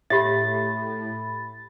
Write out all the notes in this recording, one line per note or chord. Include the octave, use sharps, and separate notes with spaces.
A2 G4 C#5 E5 B5 A6